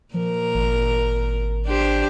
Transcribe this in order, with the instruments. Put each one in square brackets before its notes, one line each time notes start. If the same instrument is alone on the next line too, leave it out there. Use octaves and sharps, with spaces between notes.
[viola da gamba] A#2 A#4 [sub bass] F3
[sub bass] G#1
[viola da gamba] D4 G4 C5